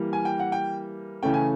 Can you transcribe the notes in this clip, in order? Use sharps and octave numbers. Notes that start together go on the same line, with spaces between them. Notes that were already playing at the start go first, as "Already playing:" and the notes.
Already playing: E3 G3 A#3
G#5
G5
F#5
G5
C#3 E3 A3 C#4 G5
G#5